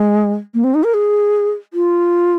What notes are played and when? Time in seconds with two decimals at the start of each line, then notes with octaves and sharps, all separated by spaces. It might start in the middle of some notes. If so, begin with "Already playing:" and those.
Already playing: G#3
0.54 A#3
0.64 C4
0.74 D#4
0.84 A#4
0.94 G#4
1.73 F4